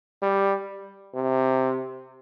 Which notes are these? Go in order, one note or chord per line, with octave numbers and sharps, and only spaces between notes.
G3
C3